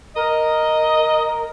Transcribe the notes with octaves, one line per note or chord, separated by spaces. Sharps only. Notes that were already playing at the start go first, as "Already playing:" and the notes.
A#4 D#5